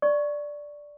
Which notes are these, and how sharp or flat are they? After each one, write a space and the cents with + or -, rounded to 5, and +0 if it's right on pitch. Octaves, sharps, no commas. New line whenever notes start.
D5 +0 C#6 +0